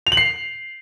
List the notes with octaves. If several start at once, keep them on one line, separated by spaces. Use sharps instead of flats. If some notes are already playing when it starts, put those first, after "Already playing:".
F7
F#7
C7